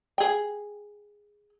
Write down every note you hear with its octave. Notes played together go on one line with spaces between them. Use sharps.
G#4 G5